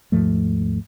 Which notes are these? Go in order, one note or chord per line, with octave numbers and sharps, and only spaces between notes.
D#2 G#2 F3 A3